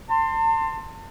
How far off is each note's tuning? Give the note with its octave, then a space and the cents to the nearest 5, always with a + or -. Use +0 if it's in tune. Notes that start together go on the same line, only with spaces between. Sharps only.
A5 +35 C6 +0